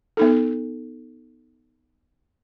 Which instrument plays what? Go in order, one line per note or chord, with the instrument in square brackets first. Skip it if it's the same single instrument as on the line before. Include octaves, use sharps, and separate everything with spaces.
[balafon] B3 D#4 A4